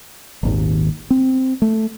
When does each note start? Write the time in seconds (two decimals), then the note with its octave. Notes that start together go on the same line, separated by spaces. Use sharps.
0.43 D#1 G#1 D#2
1.10 C4
1.62 A3